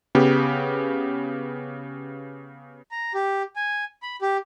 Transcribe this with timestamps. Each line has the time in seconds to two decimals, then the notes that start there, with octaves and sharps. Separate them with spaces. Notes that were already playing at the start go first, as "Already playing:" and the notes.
0.15 C#3 B3 G4
2.91 A#5
3.14 G4
3.56 G#5
4.03 B5
4.22 G4